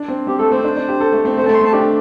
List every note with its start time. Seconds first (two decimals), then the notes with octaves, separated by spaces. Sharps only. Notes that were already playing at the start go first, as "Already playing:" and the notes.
Already playing: D4
0.08 C4
0.27 C4 G4
0.39 A3 A4
0.52 C4 C5
0.64 D4
0.77 D4
0.88 G4
1.01 A4
1.13 A3
1.25 C4
1.37 A3 C5
1.44 C4
1.46 A5
1.49 A3
1.55 C6
1.61 C4 A5
1.73 D4 G4